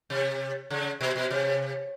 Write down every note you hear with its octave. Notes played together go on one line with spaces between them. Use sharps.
C3
C#3
B2
B2
C3